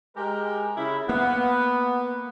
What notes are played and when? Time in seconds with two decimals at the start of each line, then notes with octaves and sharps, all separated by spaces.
0.16 G#3 G4 A#4
0.77 C#3 E4 B5
1.09 A#3 B3